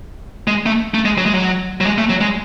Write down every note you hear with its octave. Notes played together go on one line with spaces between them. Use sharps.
G#3
A3
A3
G#3
F#3
G#3
F#3
F#3
G#3
A3
F#3
G#3